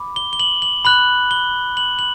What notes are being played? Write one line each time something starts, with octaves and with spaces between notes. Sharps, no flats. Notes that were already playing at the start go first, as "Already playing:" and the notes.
Already playing: B5 D6
G7
G7
F#7
F#7
B5 F#6 F#7
G7
F#7
F#7